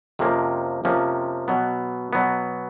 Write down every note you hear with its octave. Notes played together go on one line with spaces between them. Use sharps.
F2 C3 F3 A#3 C#4
F2 C3 F3 A#3 C#4
B2 F#3 B3
B2 F#3 B3